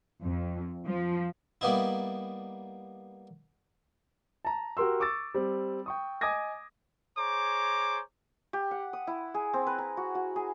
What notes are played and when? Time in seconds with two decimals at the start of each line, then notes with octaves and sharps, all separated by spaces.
0.23 F2
0.86 F3
1.61 G3 A#3 B3 D#4 E4
4.45 A5 A#5
4.77 F#4 G4 A#4 C6 E6
5.00 C#6 D6 E6 A6
5.34 G3 C4
5.86 G5 C#6 D#6
6.21 D#5 G#5 D6 D#6 G#6 A#6
7.17 G#4 C5 C#5 A#5 D6
8.53 G4
8.71 F#5
8.93 D#6
9.07 E4
9.34 G#4
9.53 C4
9.67 B4
9.79 A#5
9.97 F#4
10.15 F#4
10.36 G#4